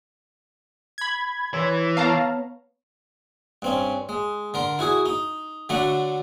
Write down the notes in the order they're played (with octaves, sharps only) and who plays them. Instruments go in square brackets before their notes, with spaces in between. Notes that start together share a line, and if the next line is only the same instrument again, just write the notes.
[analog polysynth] B5 G#6
[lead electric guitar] E3 [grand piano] C#5 C6 B6
[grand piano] B3 C#5 C#6 [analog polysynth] F5 A5 A#5
[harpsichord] G2 C4 C#4
G#3
D3 A#4 C6
E4 F#4 G#4
D#4
D3 F#3 A3 D4 F#4